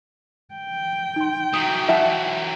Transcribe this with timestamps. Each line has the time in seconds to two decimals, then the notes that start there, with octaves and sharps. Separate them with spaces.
0.54 G5
1.16 D#4 C6
1.53 E3 F#3 D#6
1.88 E5 F#5 A5